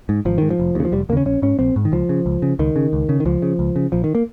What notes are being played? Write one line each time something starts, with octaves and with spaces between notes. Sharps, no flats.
G#2
G#1 F3
G#2 D#3
F3
F1
D#2 C#3
F3
F1 G3
D#2 C#3 A#3 C#4
A#1 C#4
G#2 C#4
A#1 C4
G#2
D#3
C#2 F3
C#3
C#2
C#3
C#2 D#3
C#3
C#2
C#3
D#3
C#2 F3
C#3
C#2
C#3
A#1 F3
D#3
A#3